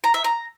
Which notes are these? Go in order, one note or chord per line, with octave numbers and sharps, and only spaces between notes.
A#5
E5
A#5